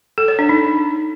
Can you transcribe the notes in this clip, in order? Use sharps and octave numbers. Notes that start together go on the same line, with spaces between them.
A4
C#5
D4
D#4